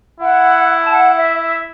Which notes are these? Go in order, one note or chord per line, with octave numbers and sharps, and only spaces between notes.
E4 F#5
A5
F#5
E5
E5